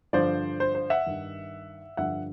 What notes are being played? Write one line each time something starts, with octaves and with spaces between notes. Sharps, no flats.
G2 D3 F3 C5 D5
C5
C5
E5 F#5
G2 D#3
G2 D3 F3 E5 F#5